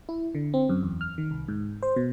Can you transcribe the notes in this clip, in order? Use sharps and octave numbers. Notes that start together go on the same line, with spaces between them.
E4
D3
C4
F#2
E2
F6
D#3
C2
G#2
C5
B2